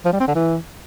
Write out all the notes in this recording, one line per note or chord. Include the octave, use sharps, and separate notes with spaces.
F3
G3
C4
D3
E3